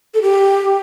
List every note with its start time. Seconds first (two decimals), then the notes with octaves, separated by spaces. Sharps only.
0.14 A4
0.22 G4